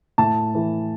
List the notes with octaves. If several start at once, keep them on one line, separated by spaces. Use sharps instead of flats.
A2 A5
E3